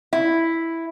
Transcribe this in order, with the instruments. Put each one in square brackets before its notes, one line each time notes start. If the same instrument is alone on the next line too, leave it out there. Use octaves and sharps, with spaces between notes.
[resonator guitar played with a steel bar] E4